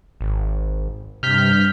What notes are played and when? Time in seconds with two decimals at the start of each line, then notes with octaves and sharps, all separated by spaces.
0.21 G#1
1.23 G2 C3 F6 G6 B6